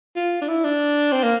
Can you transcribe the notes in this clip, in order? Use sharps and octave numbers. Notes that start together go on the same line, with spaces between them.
F4
D4
E4
D4
C4
A#3